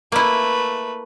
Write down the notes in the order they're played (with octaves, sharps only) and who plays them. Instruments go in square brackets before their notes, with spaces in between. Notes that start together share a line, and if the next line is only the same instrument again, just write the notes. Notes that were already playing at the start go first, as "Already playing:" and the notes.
[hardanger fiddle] A3 B4 [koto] A#3 E4